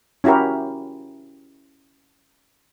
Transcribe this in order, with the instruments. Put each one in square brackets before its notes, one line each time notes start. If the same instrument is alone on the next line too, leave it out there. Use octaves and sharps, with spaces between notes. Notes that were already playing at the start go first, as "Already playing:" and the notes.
[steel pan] C#4 E4 F#4 G4 A#4